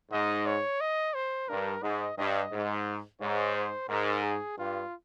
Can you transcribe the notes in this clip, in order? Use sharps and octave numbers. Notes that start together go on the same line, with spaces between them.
G#2 D#5
C#5
D#5
C5
G2 A#4
G#2 D#5
G2 D#5
G#2
G#2 C#5
C5
G#2 A#4
G#4
G2 F4